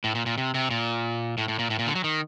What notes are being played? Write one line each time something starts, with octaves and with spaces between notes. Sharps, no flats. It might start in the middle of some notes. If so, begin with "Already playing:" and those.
A2
A#2
A#2
C3
C3
A#2
A2
A2
A#2
A2
A#2
D3
F#3
D#3